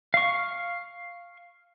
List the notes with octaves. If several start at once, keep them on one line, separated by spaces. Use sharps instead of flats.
F5 C#6